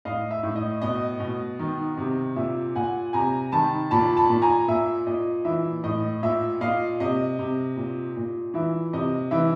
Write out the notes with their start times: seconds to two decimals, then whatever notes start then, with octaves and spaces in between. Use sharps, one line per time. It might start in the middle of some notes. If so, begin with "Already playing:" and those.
0.05 A2 D#5 F5
0.31 E5
0.43 A2
0.56 D#5
0.82 B2 D#5
1.20 B2
1.59 D#3
1.97 C3
2.36 A#2 E5
2.75 A#2 F#5 G#5
3.13 C3 G#5 A#5
3.52 D#3 A5 B5
3.91 A#2 A5 B5
4.17 A5 B5
4.30 A#2
4.42 G#5 A#5
4.68 A#2 E5
5.07 A#2 D#5
5.45 E3 E5
5.84 A2 D#5
6.23 A#2 E5
6.61 A#2 D#5 F5
7.00 C3 D#5
7.39 C3
7.77 A#2
8.16 A#2
8.54 E3 E5
8.93 C3 D#5
9.31 E3 E5